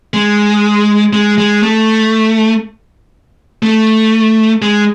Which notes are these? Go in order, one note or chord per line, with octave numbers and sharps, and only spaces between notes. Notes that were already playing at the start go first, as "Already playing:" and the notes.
G#3
G#3
G#3
A3
A3
G#3